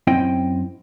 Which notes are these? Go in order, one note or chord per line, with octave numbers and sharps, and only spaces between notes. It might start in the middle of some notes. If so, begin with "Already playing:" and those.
F#2 C4 E4 D#5 G5